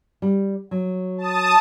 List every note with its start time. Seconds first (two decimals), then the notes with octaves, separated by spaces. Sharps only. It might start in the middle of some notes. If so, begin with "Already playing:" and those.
0.22 G3
0.71 F#3
1.18 A5 D#6